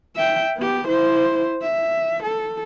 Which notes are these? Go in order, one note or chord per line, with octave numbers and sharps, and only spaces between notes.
E5 G5
B3 G4
E4 C5
E5
A4